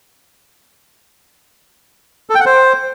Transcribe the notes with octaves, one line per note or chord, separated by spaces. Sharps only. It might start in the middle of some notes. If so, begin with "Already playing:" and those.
A4
G5
F#5
C5